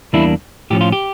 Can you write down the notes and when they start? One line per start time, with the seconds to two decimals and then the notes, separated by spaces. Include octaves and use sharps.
0.13 E2 E3 G3 A#3 D4 E4
0.70 A2 F3 C#4 G4
0.81 F4
0.92 G4